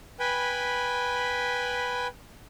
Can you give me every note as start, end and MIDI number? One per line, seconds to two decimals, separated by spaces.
0.20 2.07 71
0.20 2.07 79
0.20 2.07 80
0.20 2.07 83